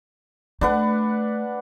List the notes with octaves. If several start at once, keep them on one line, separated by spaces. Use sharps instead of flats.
A3 D4 B4 F#5